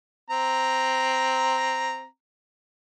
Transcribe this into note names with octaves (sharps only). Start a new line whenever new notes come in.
C4 A#5